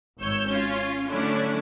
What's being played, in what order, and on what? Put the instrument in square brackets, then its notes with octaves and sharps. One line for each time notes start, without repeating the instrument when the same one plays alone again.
[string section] G#1 C#5 E6 G6
C#4 F4
D3 F#3 A3 C#4 D4 E4